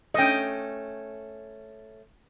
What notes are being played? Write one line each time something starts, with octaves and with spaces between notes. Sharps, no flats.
A3 C#4 D#5 G5